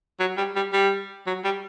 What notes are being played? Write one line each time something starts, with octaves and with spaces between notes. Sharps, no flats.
F#3
G3
G3
G3
F#3
G3